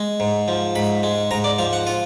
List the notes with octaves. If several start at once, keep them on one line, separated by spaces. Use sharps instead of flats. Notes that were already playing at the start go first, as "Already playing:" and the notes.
Already playing: G#3
G#2
F3
G#2 B5
G#3
G#2 A#5
D5
F3 F5
F#5
F4